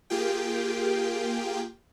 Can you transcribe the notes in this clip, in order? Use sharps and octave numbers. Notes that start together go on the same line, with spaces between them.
A#3 F4 G4 G#4 G5